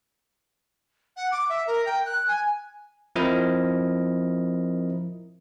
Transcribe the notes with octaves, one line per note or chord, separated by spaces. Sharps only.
F#5
D6
E5
A#4
G5
F#6
G#5
F3 C4 E4 A#4 D#5